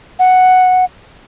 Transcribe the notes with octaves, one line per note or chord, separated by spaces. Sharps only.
F#5